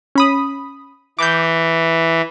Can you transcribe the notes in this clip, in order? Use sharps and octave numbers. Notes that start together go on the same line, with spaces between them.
C#4 B5 D#6
E3 D6 G6